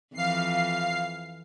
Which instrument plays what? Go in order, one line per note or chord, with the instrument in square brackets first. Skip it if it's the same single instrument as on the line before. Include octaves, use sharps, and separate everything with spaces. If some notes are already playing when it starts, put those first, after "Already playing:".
[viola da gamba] F2 E3 F3 [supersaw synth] F5 C7